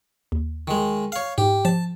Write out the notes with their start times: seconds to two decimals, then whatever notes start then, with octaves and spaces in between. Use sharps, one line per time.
0.32 D#2
0.68 D#3 G#3
1.12 C#5 F5
1.38 G#2 G4
1.65 F3 A5